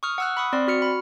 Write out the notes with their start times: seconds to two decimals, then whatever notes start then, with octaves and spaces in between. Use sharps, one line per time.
0.03 C#6 D#6 F6
0.18 F#5 E6 F#6
0.37 B5 C#6 D#6
0.53 C4 D5 C6
0.68 F#4 F6 C#7
0.82 B5